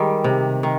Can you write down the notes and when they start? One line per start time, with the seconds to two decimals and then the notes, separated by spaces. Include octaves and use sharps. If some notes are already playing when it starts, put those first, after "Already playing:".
Already playing: D#3 G3 G#3
0.24 C3
0.63 D#3